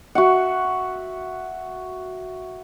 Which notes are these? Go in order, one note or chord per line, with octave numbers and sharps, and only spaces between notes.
F#4 E5 F#5